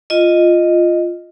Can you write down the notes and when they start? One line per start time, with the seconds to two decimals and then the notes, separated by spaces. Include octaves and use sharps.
0.10 F4 D#5